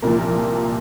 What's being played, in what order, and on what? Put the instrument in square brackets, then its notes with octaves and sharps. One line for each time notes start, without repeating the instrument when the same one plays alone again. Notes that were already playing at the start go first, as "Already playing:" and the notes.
[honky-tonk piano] C2 A#2 F3 A#3